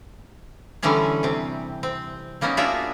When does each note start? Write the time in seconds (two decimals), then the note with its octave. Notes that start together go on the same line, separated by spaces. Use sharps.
0.83 D3 E3 G3 C#4 G#4
1.23 C3 C4
1.83 C4
2.41 F#3 A#3 B3 C#4 D#4
2.57 D4 F4 F#4 G#4 E5